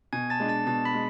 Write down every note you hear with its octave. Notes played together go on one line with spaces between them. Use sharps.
B2 G#5 G#6
A5 A6
G#3 D4
A5 A6
B2 A5 A6
B5 B6
G#3